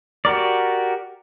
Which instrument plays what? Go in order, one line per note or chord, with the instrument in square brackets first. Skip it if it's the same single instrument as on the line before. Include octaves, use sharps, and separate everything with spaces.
[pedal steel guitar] F#4 G4 A#4 D5